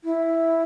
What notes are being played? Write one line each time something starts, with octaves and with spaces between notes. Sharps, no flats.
E4